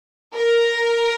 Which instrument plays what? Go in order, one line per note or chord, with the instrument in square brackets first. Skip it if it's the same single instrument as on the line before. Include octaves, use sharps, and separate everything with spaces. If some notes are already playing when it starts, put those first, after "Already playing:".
[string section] A#4